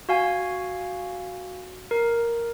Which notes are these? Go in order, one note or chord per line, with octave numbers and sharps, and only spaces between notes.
F#4 F5 G#5
A#4